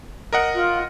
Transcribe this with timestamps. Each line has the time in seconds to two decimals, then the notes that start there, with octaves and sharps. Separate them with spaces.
0.33 A#4 D#5 F#5
0.55 F4